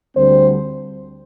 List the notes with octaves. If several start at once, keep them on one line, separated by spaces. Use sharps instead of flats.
D2 D3 G3 C4 C5